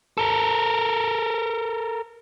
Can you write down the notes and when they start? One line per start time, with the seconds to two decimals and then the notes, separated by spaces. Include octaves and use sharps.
0.18 A4 A#4